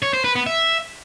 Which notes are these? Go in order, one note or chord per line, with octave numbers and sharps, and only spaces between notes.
C#5
C5
B4
B3
E5